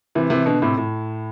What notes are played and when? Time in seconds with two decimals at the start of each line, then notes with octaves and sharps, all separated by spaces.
0.15 C3 E3
0.30 C3 E3
0.46 B2 D3
0.62 A2 C3
0.78 A2